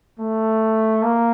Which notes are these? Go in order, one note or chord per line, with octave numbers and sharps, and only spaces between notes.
A3
A#3